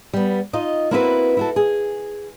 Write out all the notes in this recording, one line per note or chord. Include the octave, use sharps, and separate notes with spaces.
G3 B3
D#4 F4 D#5
A#3 C4 E4 F#4 A#4 B4
E4 F#4 A4
G#4